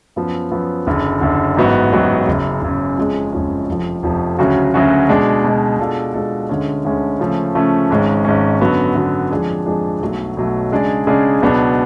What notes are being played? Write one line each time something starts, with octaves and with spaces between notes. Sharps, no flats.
F#2 F3 B3
F#2 F3 B3
F#1 F#2 D3
F#1 F#2 D3
A1 G#2 F#3 B3 F#4
A1 G#2 F#3 B3 F#4
F#1 F#2 C#3
F#1 F#2 C#3
F#1 F2 F3 G#3 C#4
F#1 F2 F3 G#3 C#4
F1 F2 F3
F1 F2 F3
D2 C#3 F#3 C#4 F#4
D2 C#3 F#3 C#4 F#4
B2 G#3 D4
B2 G#3 D4
B2 G#3 D4 F4 A4
B2 G#3 D4 F4 A4
D2 D3 G#3 C#4
D2 D3 G#3 C#4
C#3 F3 A3 C#4
C#3 F3 A3 C#4
G#1 G#2 G#3 C#4
G#1 G#2 G#3 C#4
F#2 D3 F#3 B3 F#4
F#2 D3 F#3 B3 F#4
F2 F3 G#3 D4 G#4
F2 F3 G#3 D4 G#4
B1 B2 F#3 A3
B1 B2 F#3 A3
C#3 G#3 D4 G#4 D5
C#3 G#3 D4 G#4 D5
C#2 B2 F#3 B3 D4